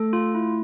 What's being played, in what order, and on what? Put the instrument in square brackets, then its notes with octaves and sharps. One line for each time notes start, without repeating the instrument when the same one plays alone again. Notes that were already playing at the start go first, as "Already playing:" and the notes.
Already playing: [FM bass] A3 [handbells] A4
[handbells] F4
E4